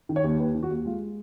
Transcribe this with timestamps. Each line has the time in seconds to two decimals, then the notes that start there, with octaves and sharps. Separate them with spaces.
0.09 D#3
0.16 C#5
0.24 D#2
0.39 D#2 B4
0.55 D#3
0.63 F#4
0.70 D#2
0.85 G#3 F4